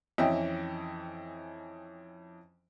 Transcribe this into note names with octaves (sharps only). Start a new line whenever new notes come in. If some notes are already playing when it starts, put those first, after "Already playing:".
F2 E3 C#4 D#5 E5 G5